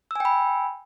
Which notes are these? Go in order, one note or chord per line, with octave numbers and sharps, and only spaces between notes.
G5 G#5 B5 E6